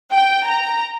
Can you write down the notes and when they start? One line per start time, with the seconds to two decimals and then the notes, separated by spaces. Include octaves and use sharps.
0.13 G5
0.47 A#5